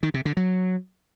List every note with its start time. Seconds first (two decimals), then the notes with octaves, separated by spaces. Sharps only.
0.03 D#3
0.14 C3
0.25 D3
0.37 F#3